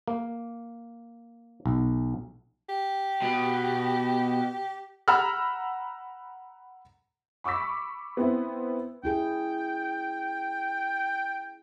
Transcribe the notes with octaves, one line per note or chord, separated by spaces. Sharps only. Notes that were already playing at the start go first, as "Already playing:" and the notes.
A#3
B1
G4
B2
F#5 A#5 B5 E6 F6
B5 C#6 D6 E6 B6
B3 C4 E4
C#4 E4 G#4 G5